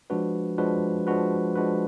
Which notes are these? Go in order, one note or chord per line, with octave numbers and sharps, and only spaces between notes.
F3 G#3 D4 F#4 B4
F3 G#3 D4 F#4 B4
F3 G#3 D4 F#4 B4
F3 G#3 D4 F#4 B4